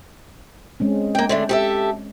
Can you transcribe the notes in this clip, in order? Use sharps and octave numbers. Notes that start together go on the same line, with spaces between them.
G#3 C4 C#4
A#3 G5
D3 A3 D4
G4 A4 E5